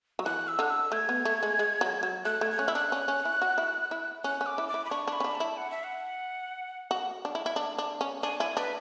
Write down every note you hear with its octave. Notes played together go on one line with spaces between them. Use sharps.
F#3
E3 F#6
E6
D3 F#6
E6
A3 G#6
B3
A3
G#3
G#3
F#3
F#3
A3 F#6
A3 G#6
G#6
C#4 F#6
E4 E6
D4 F#6
C#4
C#4
E4
F#4
E4
E4
C#4 F#6
C#4
D6
E4
D6
E4
B5
D4 C#6
D4
B5
C#4
D4
A5
E4
F#5
E5
F#5
F#4
D4
E4
E4
D4
D4
C#4
D4 G#5
E4 G#5
D4 B4